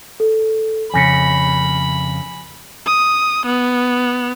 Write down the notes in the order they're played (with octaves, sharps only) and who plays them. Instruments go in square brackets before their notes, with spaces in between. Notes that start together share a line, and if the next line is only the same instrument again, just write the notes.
[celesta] A4
[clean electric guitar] F2 C#3 [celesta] G#5 A#6 C#7 [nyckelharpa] B5
[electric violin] D#6
B3